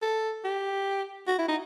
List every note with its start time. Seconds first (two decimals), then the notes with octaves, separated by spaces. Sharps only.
0.02 A4
0.44 G4
1.28 F#4
1.39 E4
1.48 D#4